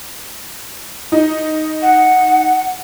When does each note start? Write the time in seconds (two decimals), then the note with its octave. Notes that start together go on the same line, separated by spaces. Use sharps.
1.12 D#4
1.82 F#5